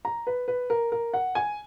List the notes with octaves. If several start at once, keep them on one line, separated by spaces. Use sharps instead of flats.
A#5
B4
B4
A#4
A#4
F#5
G#5